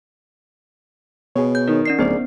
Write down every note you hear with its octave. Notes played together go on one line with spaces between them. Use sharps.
B2 G#4 C#5
G6
D#3 A#4
C#4 D5 C7
D1 B3 G#4 A#4 C5 D5